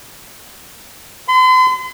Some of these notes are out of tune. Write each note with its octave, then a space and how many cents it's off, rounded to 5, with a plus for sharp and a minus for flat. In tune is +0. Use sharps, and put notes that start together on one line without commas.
C6 -45